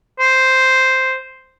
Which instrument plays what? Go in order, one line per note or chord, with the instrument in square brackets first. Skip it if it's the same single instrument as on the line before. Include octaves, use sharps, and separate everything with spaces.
[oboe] C5